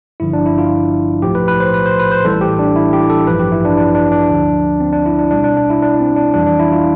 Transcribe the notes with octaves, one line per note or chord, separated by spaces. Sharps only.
G1 G2 D3 F3 E4
D4
E4
F4
B1 A2 F3 G4
B4
B4
C5
B4
C5
B4
C5
A1 A2 E3 G3 A4
G4
D4
E4
G4
A4
A1 G2 F3 B4
G4
E4
D4
D4
D4
D4
D2 D3 F3
C4
D4
E4
D4
B1 B2 G3 D4
D4
D4
E4
D4
C4
D4
F2 E3 G3 D4
D4
E4
F4